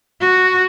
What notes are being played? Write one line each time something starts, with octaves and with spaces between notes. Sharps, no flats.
F#4